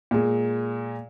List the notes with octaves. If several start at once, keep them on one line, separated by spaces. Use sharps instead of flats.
A#2 G#3